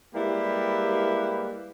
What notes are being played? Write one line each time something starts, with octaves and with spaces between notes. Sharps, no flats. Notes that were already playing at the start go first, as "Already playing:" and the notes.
G3 G#3 A#3 E4 G4 B4